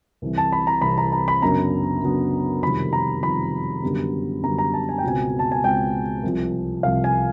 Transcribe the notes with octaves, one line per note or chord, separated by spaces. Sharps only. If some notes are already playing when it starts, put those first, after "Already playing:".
C2 C3 E3
A5
B5
A#5
C2 C3 E3 B5
A#5
A#5
B5
F#2 C#3 F#3 B3 D4 A#5
F#2 C#3 F#3 B3 D4
F2 C3 D#3 G3 B5
A#5
F2 C3 D#3 G3 B5
F#2 D3 G3 B3
F#2 D3 G3 B3 A#5
A#5
A5
G#5
G5
C#2 B2 G#3 C4 G#5
A5
G#5
C#2 B2 G#3 C4 G5
C2 C3 F3
C2 C3 F3 F5
G#5